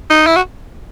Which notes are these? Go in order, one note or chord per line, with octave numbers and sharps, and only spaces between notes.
D#4
E4
F#4